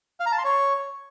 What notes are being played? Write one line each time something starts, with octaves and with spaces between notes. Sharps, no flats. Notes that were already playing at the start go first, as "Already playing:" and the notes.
F5
A#5
A5
C6
C#5